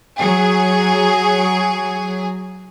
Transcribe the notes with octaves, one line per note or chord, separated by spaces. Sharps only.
F#3 G#4